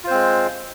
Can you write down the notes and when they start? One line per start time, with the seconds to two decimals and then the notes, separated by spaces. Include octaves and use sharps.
0.04 F4
0.07 C5
0.11 C4
0.14 G#3